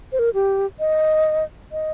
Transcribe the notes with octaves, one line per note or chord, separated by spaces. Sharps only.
C5
A#4
G4
D#5
D#5